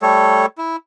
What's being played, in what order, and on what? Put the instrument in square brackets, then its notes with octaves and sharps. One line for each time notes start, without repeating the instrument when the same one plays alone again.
[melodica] G3 A3 A4 C#5
E4